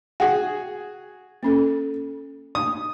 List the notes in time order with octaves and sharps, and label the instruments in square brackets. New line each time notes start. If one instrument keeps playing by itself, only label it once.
[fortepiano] F#4 G#4 [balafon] F#5 G5
[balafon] A#3 C#4 A4
[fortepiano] D#6